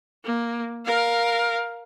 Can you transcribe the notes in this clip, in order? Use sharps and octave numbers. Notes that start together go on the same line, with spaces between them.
A#3
A#4 F5